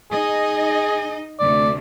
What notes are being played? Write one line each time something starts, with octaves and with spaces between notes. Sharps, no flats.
D#4 G#4 D#5
D2 C3 A3 D5